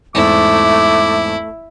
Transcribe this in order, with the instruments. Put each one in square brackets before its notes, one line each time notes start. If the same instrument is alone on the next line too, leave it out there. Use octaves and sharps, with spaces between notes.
[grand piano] E2 G#2 C4 [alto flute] A3 [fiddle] E4 [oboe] D6